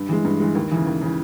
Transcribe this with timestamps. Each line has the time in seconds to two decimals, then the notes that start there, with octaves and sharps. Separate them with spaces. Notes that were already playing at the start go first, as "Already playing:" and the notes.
Already playing: G2
0.09 E3 G#3
0.25 G2
0.40 E3 G#3
0.55 D#2
0.72 C#3 E3
0.86 D#2
1.01 C#3 E3